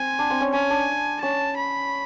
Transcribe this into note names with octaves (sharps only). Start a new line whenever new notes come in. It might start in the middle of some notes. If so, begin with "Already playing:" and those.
Already playing: C4 G#5
D4
C4
C#4
C#4 G#5
D4
C#4 A5
B5